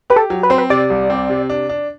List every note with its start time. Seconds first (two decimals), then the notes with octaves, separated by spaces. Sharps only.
0.10 G4 B4
0.16 A4
0.30 F#3
0.43 B4
0.50 C4 C5
0.58 B4
0.70 C3 D5
0.90 C2
1.10 C4
1.29 C3
1.50 D4
1.69 D4